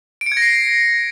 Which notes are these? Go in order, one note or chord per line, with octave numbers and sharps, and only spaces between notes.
D7
C#7
G#6
A#6
C7